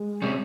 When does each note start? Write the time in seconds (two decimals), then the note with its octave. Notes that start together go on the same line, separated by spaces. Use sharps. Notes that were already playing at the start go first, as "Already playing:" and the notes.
Already playing: G#3
0.22 C3 G3 C#4